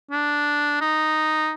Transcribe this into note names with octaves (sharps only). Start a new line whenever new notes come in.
D4
D#4